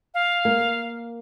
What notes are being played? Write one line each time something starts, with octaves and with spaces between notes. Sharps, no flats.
F5
A#3